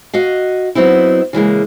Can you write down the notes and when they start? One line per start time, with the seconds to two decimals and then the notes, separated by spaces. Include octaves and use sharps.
0.14 F#4 D#5 F5
0.75 F#3 B3 C4 D#4 E4
1.33 C#3 E3 G#3 A#3